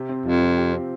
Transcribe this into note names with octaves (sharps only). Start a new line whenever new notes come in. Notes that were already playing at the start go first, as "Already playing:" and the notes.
Already playing: C3 G4
C4
F2 F3
F3
G4
C4